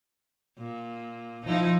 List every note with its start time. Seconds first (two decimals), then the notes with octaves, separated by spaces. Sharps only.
0.59 A#2
1.46 F3 D#4 E4